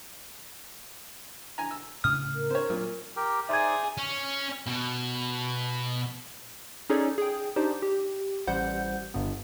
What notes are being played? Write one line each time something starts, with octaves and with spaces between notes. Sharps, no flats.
G#5 A#5
E6
A2 C#3 D#6 F6
A#4
C4 C5 C#5
A#2 F#3
G4 A#4 G5
D#4 G#4 C5 D5 E5 G#6
C#4
B2
C#4 D#4 G#4 A4 C#5 D5
G#4 G5
D4 D#4 G4 C5 D5
G4
A1 G3 C5 F#5 G6
G1 G2 B3